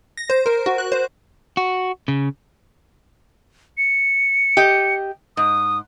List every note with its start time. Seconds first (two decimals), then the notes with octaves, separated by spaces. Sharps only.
0.17 A#6
0.30 C5
0.46 A#4
0.66 F#4
0.78 F#6
0.92 C5
1.57 F#4
2.08 C#3
3.78 C#7
4.57 G4 D#5
5.37 G#2 D#6